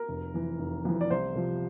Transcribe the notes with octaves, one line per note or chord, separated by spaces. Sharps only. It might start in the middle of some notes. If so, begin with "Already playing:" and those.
Already playing: A#4
F1
F2 E3
F1
F2 E3
D5
C2 C5
C3 F3